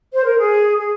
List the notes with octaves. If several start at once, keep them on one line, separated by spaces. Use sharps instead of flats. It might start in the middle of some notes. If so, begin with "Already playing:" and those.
C5
A#4
G#4
G#4